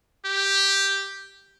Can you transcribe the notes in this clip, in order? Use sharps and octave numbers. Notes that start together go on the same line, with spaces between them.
G4